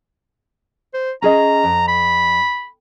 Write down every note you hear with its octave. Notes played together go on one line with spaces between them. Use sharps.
C5
C#4 G#4 D#5 A#5
F2
B5